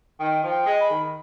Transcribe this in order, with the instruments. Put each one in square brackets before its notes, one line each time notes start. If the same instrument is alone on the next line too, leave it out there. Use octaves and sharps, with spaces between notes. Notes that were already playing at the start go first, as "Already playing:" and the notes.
[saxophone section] D#3 [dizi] G5
[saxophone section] F3
[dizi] G5
[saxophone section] G#3
[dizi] B5
[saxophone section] D#3